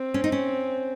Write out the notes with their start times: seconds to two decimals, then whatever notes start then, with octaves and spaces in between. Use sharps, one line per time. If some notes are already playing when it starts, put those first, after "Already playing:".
Already playing: C4
0.14 C#4
0.24 D#4
0.32 C#4